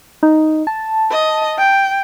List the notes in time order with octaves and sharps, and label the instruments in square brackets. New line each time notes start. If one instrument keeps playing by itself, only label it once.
[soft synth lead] D#4
A5
[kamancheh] D#5
G5